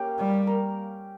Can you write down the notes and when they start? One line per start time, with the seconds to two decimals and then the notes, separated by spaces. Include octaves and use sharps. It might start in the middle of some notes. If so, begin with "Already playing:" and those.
Already playing: A#3 C#4 G4
0.18 G3
0.47 A#4